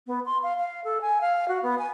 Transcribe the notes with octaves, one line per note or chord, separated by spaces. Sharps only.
B3
C6
F5
F5
A4
G#5
F5
F#4
B3
G#5